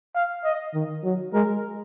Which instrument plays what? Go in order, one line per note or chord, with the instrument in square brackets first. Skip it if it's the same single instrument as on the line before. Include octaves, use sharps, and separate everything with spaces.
[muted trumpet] F5
D#5
[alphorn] D#3
F#3
[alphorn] G#3 [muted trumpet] A#4